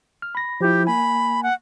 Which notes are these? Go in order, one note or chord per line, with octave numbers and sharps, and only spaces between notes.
F6
B5 A#6
F3 E4 G4
A#3 G#5 B5
F#5